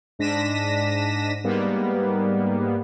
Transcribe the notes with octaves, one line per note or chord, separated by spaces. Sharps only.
G#2 D4 A#6 B6 D#7 E7
G#2 G3 A#3 B3